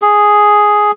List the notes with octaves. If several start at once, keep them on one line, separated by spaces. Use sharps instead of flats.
G#4